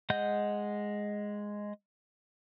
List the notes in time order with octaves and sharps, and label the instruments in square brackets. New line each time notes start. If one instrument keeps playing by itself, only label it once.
[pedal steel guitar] G#3 D#5 F#5 G6